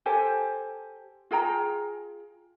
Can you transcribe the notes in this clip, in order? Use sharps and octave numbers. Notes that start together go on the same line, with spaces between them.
G4 A4 C5 G#5
F4 G#4 G5 A#5